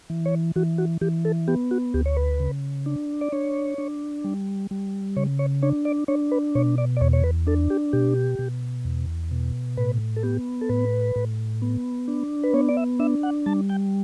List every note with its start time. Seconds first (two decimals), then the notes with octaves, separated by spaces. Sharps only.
0.10 E3
0.26 C#5
0.56 E3 F#4
0.78 F#4
1.01 E3 G4
1.25 A4
1.48 B3 G4
1.71 F#4
1.94 D2 G4
2.06 C#5
2.17 B4
2.40 C#3
2.86 D4
3.21 D5
3.32 D4 C#5
3.78 D4
4.24 G3
4.71 G3
5.17 C#3 C#5
5.39 C#5
5.63 D4 C#5
5.85 D5
6.08 D4 C#5
6.31 B4
6.55 B2 C#5
6.78 D5
6.97 D5
7.01 E2 C#5
7.13 C#5
7.24 B4
7.47 D4 A4
7.70 G4
7.93 B2 G4
8.39 B2
8.85 E2
9.31 B2
9.77 A2 B4
10.16 A4
10.23 B3 G4
10.61 A4
10.69 A2 B4
11.16 A2
11.62 B3
12.08 D4
12.44 B4
12.54 B3 C#5
12.69 D5
12.77 E5
12.99 D4 E5
13.23 F#5
13.46 G3 A5
13.69 G5